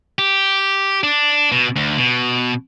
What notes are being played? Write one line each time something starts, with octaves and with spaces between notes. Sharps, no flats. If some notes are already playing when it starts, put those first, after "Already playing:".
G4
D4
B2
D2
B2